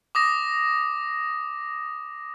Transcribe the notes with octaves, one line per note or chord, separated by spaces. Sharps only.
D6 D#6 A#6